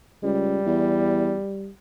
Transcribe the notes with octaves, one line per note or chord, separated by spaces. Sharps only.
C#2 G3
E2